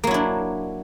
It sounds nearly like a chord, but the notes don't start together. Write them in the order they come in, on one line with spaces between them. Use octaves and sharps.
A#3 F#3 E4 D4